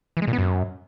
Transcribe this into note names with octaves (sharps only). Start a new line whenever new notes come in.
E3
G#3
A#2
B3
F#2